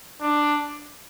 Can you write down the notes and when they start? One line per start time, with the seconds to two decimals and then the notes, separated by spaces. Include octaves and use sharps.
0.21 D4